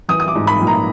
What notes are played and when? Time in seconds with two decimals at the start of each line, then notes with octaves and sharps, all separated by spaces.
0.09 E3 D#6
0.20 D#6
0.28 D6
0.35 G#2
0.47 B5
0.60 A#1
0.67 A#5